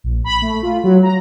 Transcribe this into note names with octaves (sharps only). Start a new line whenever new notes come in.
A#1
B5
A3
F4
F#3
A#5